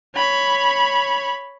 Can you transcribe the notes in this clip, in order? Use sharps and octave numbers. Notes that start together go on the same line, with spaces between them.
C#5 B5